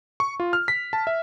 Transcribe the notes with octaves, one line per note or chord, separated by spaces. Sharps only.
C#6
F4
F6
B6
A5
E5